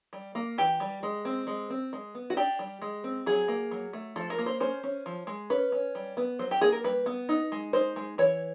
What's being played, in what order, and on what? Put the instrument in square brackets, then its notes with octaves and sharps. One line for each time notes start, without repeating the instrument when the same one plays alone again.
[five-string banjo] G3
A#3
E3 G4
G3
G#3
C4
G#3
C4
G#3
B3
F#4
D4 G4
G3
G#3
C4
F#3 G#4
A#3
F#3
A3
F3 A4
A#4
A#3
C5
C#4 C5
C#4
F3
G#3
C#4 B4
C#4
G3
B3
F#3 C5
G4
A#3 G#4
A#4
G3 B4
B3
D#4
G#3
D#4 C5
G#3
E3 C#5